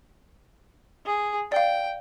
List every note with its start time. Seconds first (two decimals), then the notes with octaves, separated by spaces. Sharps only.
1.06 G#4
1.52 D5 F5 G5